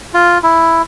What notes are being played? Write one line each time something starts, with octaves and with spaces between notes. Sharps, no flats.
F4
E4